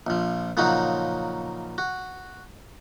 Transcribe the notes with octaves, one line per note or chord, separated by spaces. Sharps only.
A#1 F3
A#2 C#3 F3 F#3 D#4 F#4
F#4